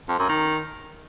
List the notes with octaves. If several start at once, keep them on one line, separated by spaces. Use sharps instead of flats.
F2
F#2
D#3